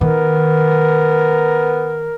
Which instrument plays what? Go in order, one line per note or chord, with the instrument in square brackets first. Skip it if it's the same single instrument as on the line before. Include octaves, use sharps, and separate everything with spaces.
[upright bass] D#3 [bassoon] B3 [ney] A#4